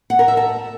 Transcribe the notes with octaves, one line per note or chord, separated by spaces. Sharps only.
F#5
A#4
E5
A5